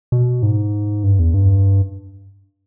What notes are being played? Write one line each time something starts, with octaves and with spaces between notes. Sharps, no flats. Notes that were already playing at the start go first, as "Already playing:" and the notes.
B2
G#2
G2
E2
G2